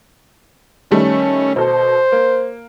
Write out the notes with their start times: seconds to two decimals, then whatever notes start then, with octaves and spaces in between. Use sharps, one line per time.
0.91 D#3 G3 A3 C#4
1.56 B2 A4 C5
2.12 A#3